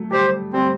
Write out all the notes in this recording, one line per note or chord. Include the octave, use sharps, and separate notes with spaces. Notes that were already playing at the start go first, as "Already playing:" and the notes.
Already playing: F#3 A3
G3 G4 C5
G3 C4